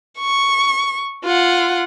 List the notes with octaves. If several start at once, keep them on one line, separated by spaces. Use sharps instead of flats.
C#6
F4 F#5